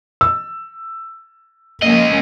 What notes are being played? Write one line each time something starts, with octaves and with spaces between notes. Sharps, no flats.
E6
C#2 F3 A#3 C#4 D#5